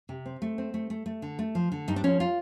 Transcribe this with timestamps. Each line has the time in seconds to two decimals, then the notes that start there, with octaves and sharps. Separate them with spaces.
0.09 C3
0.26 C4
0.42 A3
0.58 C4
0.74 A3
0.90 A3
1.06 A3
1.22 D3
1.39 A3
1.55 F3
1.72 D3
1.88 G2 D#4
1.96 D4
2.04 F3 C#4
2.20 F4